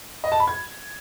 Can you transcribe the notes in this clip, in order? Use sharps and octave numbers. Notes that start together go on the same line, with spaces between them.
D#5
A5
B5
G#6